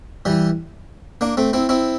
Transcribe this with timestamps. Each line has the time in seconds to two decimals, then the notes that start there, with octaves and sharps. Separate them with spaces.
0.25 E3 G3
1.21 A#3 D4
1.37 A3 C4
1.53 C4 E4
1.69 C4 E4